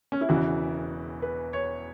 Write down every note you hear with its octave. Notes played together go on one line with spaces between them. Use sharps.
C#4
E4
E1 E2 C#3 E3 F#4
B4
C#5